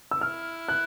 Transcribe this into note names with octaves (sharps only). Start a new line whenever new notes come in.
E6
E4 F6
F#6